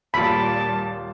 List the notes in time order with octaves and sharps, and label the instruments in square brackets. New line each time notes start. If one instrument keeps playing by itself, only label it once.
[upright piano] D#1 F4 [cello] A#2 G3 [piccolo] A5 [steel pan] B5